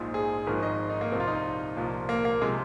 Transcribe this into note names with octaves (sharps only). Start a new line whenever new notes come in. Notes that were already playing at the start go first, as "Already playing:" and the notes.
Already playing: A#1 G#2 F3
G#4
G#1 G#2 F3 A#4
D#5
D#4
A#3
C2 A#2 F3 C4
F4
D#4
C2 A#2 F3
A#3
A#3
C3 F3 G#3